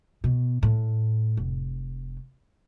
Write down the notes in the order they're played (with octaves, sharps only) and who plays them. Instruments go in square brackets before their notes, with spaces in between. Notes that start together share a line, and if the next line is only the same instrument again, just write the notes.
[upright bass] B2
A2
F1